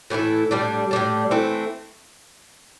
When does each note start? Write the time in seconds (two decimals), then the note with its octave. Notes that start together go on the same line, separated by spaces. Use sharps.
0.10 A2 E3 A3 E4
0.51 A2 G3 D4
0.91 A2 G3 D4
1.31 E3 A3 C4 E4